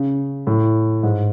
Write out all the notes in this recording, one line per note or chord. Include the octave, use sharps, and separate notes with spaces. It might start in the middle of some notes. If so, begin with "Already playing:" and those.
Already playing: C#3
A2
G#2